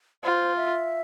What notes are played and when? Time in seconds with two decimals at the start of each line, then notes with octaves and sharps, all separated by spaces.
0.24 F4 C5
0.57 E5